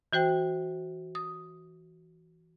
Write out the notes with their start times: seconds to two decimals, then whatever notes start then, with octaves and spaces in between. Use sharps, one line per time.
0.13 E3 F#4 C5 G5
1.15 D#6